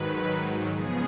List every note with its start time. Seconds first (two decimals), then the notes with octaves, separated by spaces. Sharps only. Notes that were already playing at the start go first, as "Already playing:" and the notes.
Already playing: G#2 D#3 F#3 B4
0.69 C#3 F3 G#3 B3 G#4